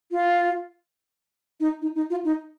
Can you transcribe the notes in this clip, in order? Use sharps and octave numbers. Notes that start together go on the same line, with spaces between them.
F4
D#4
D#4
D#4
F4
D#4